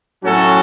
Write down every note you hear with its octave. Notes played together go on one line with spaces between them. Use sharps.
A2 F#3 C#4 F#4 A4